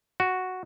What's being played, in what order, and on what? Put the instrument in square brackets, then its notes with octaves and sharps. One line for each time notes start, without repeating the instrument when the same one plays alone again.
[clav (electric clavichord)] F#4